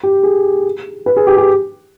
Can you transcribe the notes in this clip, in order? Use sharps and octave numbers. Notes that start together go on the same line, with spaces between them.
G4
G#4
B4
G#4
G4
G4